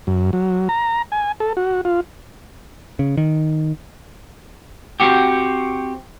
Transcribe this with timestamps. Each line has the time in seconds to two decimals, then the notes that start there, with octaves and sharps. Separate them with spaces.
0.07 F#2
0.33 F#3
0.69 A#5
1.12 G#5
1.40 A4
1.57 F#4
1.85 F4
2.99 C#3
3.17 D#3
5.00 C4 F#4 G4